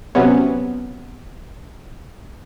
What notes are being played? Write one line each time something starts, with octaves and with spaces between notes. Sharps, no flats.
C3 F#3 B3 C#4